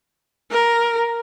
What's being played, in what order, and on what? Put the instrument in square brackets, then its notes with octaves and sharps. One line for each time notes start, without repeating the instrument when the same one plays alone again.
[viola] A#4